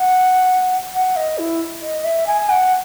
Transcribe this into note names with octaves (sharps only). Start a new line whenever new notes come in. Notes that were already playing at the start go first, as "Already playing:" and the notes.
Already playing: F#5
F#5
D#5
E4
D#5
E5
G#5
F#5